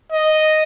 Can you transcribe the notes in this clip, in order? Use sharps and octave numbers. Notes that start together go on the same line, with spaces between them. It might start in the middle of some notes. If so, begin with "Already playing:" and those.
D#5